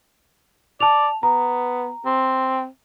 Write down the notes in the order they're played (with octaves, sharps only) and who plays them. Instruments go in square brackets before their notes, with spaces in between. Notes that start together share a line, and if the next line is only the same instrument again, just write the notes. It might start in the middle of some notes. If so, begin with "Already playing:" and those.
[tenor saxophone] D5 [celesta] A5 F7
[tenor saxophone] B3 [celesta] A#5
[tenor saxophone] C4